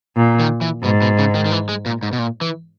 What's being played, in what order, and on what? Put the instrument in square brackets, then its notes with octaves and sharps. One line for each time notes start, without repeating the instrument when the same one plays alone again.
[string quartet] A#2
[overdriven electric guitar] D#3
E3
[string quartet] G#2 [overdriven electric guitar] B2
[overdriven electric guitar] B2
C#3
D#3
D#3
E3
G#3
A#2
G#2
B2
A#2
E3